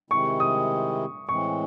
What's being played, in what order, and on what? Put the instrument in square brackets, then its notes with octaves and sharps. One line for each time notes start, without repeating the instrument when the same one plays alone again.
[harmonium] C3 D#3 G#3 C4 E4 [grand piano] C#6
[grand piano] D#6
[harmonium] A2 E3 G#3 C4 [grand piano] C#6